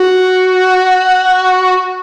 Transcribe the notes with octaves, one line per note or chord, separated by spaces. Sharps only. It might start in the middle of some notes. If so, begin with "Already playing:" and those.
Already playing: F#4